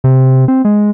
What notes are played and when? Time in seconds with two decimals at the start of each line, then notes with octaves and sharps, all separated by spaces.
0.04 C3
0.48 C4
0.65 G#3